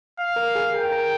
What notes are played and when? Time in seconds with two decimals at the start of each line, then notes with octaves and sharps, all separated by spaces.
0.19 F5
0.36 A#4
0.55 G#4
0.74 A#4 G5
0.92 A#4